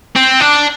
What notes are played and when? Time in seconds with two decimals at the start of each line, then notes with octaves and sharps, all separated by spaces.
0.16 C4
0.41 D4